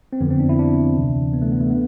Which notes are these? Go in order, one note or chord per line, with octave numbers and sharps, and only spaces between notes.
C4
F2 D3 F3 B3
C4
D4
E4
D4
D2 C3 E3
B3
A3
B3
A3
B3